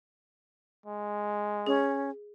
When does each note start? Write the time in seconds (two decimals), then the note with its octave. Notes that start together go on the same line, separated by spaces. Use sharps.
0.86 G#3
1.66 C#4 G#4